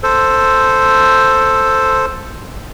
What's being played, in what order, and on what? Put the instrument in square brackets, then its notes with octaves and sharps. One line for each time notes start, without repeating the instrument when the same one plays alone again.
[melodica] A4 C5